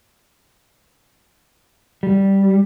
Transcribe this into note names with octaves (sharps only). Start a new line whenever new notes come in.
G3